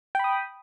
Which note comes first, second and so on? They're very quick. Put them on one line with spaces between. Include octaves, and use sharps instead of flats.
G5 B5 D#6